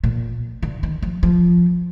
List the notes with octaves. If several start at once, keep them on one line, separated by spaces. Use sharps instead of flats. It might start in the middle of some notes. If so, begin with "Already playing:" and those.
A#2
D3
D#3
F3
F3